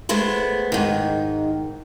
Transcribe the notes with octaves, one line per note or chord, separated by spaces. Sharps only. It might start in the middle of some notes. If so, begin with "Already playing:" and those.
G#3 A3 B3 C5
G#2 D#3